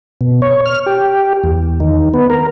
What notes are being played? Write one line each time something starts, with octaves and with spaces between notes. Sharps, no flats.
B2
C#5
F6
G4
E2
D#3
B3
A#4